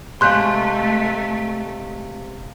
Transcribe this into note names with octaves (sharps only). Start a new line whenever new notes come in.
C3 G#3 A3 F5 C6 C#6 F#6 G6